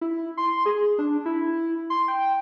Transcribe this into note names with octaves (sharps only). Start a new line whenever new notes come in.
E4
C6
G#4
D4
E4
C6
G5